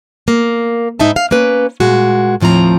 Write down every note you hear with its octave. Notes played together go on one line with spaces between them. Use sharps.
A#3
G#2 D#4 E4 E5 A5
F5
A#3 C#4 B4
A#2 G#3 F#4
D#2 A2 F3 C4 A#5